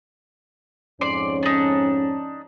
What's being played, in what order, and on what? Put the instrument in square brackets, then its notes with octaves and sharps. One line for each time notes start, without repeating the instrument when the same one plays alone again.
[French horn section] F2 G#2 C#4 [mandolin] D5 C6
[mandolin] D4 D#4